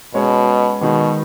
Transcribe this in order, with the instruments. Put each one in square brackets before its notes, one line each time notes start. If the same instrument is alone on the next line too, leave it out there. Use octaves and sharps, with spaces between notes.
[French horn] B2 [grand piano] G#3 C#4 G#4 C#5
[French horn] B2 [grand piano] D#3 G#3 D#4 G#4